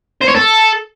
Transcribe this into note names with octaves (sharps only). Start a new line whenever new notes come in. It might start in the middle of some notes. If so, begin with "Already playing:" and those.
C5
C#5
A4